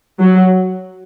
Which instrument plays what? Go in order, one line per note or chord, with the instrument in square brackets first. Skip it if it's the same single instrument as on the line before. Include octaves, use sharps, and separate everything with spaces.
[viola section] F#3